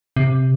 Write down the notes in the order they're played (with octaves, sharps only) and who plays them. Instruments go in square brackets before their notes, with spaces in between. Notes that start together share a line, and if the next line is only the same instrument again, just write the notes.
[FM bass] C3